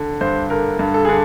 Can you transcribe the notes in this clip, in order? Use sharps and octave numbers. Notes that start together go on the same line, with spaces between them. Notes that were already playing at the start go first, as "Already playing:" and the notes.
Already playing: D3
G2 C5
D3 A#4
G2
A4
D3 G#4